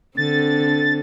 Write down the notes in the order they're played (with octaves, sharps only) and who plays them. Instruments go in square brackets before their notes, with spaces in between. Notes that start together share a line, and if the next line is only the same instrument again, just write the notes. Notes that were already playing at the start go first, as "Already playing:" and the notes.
[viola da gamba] D3 C4 [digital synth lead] A6